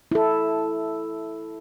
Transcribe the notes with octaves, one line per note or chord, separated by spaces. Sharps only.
E4 A4